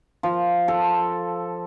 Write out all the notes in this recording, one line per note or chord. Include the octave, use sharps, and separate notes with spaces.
F3
A4